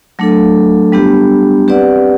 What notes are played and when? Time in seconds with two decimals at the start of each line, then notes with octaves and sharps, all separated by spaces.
0.19 F#3 A3 D4 A4
0.92 G3 B3 D4 G4
1.68 C4 G4 B4 D5 F#5